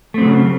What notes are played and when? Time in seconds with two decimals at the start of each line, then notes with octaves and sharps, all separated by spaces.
0.14 A3
0.18 C4
0.22 F#3
0.25 C#3